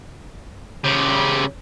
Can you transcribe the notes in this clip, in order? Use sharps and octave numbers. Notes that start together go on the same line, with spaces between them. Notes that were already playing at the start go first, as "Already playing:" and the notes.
C#3 G4